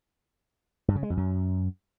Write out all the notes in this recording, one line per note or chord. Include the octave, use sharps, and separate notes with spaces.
G2
C#3
G#3
F2
F#2